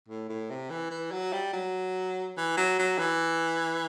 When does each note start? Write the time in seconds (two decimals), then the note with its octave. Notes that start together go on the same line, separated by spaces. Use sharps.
0.09 A2
0.29 A2
0.50 C3
0.70 E3
0.91 E3
1.12 F#3
1.33 G3
1.53 F#3
2.37 E3
2.57 F#3
2.79 F#3
2.99 E3